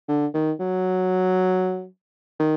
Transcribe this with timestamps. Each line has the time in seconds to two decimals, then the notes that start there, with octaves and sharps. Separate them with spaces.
0.08 D3
0.34 D#3
0.60 F#3
2.40 D#3